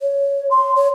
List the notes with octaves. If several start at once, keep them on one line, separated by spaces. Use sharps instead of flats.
C#5
C6
C#5